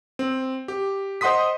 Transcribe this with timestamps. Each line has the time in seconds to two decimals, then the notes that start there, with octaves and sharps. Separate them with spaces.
0.19 C4
0.68 G4
1.21 C5 D#5 F#5 C6 D#6 B6